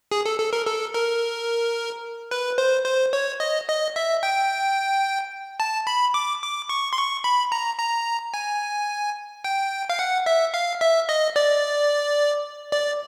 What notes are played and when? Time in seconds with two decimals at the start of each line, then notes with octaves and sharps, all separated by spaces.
0.12 G#4
0.26 A4
0.39 A4
0.53 A#4
0.66 A4
0.94 A#4
2.31 B4
2.58 C5
2.86 C5
3.13 C#5
3.40 D#5
3.68 D#5
3.96 E5
4.23 G5
5.60 A5
5.87 B5
6.14 D6
6.42 D6
6.69 C#6
6.93 C6
6.98 C#6
7.24 B5
7.52 A#5
7.79 A#5
8.34 G#5
9.44 G5
9.89 F5
9.99 F#5
10.26 E5
10.54 F5
10.81 E5
11.09 D#5
11.36 D5
12.72 D5